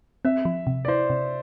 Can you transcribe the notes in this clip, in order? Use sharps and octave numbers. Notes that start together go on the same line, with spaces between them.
C4 E5
F3
C3
D5
E4 C5
C3